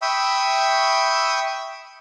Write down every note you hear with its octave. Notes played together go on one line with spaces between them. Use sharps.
E5 G5 B5 C#6 D#6 E6